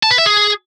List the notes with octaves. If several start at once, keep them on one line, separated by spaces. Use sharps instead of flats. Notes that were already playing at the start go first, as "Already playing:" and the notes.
A5
B4
E5
G#4